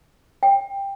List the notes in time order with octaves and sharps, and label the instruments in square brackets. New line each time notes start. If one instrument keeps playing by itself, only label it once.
[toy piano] G5